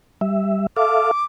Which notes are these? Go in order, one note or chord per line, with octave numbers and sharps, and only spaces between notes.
G3 E5
A4 E5 F5 D6